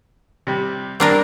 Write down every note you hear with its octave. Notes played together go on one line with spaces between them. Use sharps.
C3 G3
G2 A#3 C4 D4 A#4 D6